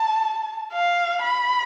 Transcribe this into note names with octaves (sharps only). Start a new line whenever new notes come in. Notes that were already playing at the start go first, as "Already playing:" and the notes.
Already playing: A5
F5
B5